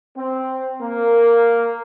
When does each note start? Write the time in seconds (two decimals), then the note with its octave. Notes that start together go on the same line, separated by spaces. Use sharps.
0.16 C4
0.81 A#3